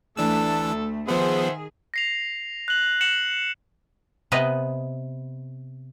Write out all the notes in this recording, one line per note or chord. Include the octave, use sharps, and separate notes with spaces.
D2 E3 A3 D4 A4 A5 E6
D#3 F3 B3 G#4 C5 E5 F#5 C6
A#6 C7 F7
F#6 F#7
C#7 E7 F#7
C3 B3 B4 D#5